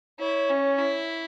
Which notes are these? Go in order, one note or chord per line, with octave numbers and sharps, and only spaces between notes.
E4 C#5
C#4
E4